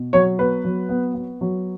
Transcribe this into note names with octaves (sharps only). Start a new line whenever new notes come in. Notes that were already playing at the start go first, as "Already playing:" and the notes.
Already playing: B2
F#3 C#5
B3 B4
F#3
B3
B3
F#3